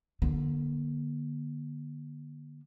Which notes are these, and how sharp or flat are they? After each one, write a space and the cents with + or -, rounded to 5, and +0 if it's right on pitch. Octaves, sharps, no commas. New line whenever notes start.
D3 +20 A#3 +40